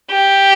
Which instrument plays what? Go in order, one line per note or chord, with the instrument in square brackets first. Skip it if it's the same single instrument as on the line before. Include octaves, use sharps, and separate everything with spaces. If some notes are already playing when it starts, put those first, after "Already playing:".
[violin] G4